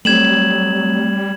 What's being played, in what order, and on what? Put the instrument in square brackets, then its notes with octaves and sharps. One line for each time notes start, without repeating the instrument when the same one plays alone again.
[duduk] F#3 [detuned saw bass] G3 [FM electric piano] A3 C4 [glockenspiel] G#6 E7 F#7